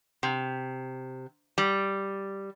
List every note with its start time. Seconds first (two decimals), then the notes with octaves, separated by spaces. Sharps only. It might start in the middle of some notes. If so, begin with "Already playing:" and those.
0.23 C3
1.58 G3